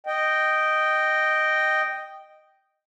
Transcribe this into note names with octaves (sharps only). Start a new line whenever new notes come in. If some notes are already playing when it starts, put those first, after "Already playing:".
D#5 G5